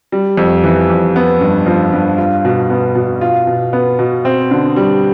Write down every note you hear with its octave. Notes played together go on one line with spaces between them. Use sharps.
G3
F2
E3
F2
B3
G2
F3
G2
F4
B2
B3
B2
F4
B2
B3
B2
C4
D3
G3